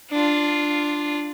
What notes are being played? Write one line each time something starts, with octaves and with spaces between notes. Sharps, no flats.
D4 F4